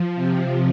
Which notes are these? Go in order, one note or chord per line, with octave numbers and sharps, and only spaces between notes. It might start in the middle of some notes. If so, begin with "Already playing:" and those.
Already playing: F3
C3